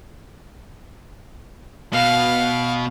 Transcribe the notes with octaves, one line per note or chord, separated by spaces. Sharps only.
B2 F5